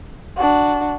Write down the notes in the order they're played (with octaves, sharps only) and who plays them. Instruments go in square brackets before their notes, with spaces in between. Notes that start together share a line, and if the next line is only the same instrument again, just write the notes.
[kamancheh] D4 F#4